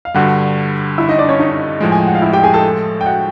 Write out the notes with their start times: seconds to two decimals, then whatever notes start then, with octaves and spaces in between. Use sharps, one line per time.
0.05 F5
0.14 G2 D3 G3 F#4 F#5
0.98 E4 E5
1.08 D#4 D#5
1.18 D4 D5
1.29 C#4 C#5
1.40 D#4 D#5
1.81 A2 F3 G#3
1.92 G#5
1.99 G5
2.07 F#5
2.15 F5
2.22 E4 E5
2.33 G4 G5
2.44 G#4 G#5
2.54 A4 A5
3.01 G5
3.06 F#4 F#5